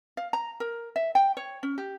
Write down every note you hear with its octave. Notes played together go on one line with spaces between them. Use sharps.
F5
A#5
A#4
E5
G5
C#5
C#4
G4